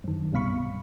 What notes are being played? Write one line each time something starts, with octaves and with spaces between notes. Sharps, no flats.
F#2 D#3
C2 G2 B2 F5 B5 C#6